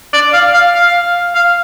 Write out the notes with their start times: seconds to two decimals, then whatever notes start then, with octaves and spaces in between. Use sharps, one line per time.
0.13 D5
0.33 F5
0.54 F5
0.75 F5
1.35 F5